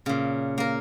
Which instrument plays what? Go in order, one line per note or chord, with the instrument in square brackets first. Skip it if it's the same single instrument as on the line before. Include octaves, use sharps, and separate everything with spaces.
[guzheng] A#2 C#3
A#3 A#4